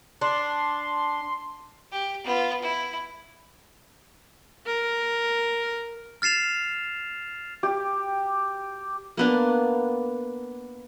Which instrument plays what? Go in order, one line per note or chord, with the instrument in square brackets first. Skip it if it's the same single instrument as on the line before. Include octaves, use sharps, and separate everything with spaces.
[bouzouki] D4 [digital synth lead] C6
[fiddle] G4
B3 F4
E4
[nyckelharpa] A#4
[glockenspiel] F6 A6 C7 E7 F7
[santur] G4
[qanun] A#3 B3 D4